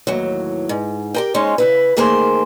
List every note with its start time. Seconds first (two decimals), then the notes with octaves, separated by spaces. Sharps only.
0.07 D#2 A2 E3 F#3
0.69 G#2
1.14 G4 A#4 G5
1.34 G#3 C#4 D#4 C5 C#5
1.58 C#3 E4 B4
1.97 D#3 A3 A#3 G#4 A#4 C5